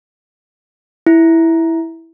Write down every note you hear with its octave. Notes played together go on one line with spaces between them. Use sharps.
E4